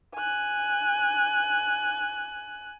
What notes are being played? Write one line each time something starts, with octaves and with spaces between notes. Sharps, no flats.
G#5 F#6